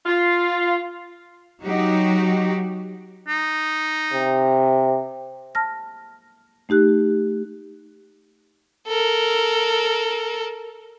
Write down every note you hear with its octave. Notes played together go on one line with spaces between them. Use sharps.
F4
F#3 D#4 F#4 G4
D#4
C3
A5 F6 A#6
A3 D#4 G4 F#6
A4 A#4